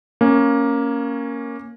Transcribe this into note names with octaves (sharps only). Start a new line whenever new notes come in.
A#3 C#4